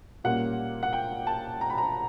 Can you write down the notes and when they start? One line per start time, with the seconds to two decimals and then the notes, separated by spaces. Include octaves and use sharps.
0.24 A#2 G3 A#3 C#4 F#5
0.83 F#5
0.93 G5
1.27 A5
1.61 A#5
1.70 B5
1.78 A#5